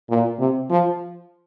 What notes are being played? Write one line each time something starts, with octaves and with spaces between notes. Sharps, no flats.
A#2
C3
F3